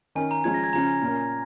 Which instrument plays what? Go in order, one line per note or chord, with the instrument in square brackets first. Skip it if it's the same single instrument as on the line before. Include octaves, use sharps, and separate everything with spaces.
[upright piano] D#3 C#4 [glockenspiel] G#5
[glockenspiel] A#5
[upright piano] F3 G#3 C#4 [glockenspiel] G#6
[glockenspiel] A#6
G#6
[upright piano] C#3 F3 C#4 [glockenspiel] A#5
[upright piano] A#2 A#3 C#4